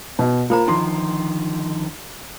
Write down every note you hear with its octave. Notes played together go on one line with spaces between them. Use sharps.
B2
A#3 F4 C5 A#5
D3 D#3 F3 C6